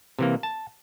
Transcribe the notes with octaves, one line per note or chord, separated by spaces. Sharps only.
C3 E3 A#3
A5